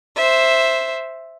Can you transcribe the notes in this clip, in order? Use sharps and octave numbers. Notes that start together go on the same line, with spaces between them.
C5 E5